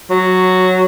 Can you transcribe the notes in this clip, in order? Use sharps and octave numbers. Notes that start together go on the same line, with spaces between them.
F#3